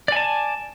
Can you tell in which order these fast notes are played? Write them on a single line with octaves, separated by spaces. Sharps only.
D5 G#5 A5